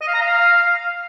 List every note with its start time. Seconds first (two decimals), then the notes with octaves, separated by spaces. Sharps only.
0.01 D#5
0.08 F5
0.14 A#5
0.20 F5